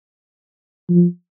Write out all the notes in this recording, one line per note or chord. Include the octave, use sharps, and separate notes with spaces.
F3